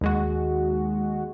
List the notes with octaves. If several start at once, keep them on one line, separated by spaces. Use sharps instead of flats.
D#2 G#3 F#4